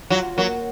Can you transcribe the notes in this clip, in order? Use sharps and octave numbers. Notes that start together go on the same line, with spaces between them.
F#3 F4
F#3 A#3